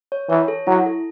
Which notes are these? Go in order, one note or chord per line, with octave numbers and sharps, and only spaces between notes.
C#5
E3 C#5
A4
F#3 E4
A4